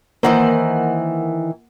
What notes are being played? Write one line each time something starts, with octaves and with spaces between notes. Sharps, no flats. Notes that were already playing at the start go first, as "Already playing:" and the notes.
D#3 E3 A#3 A#4 C5 F#5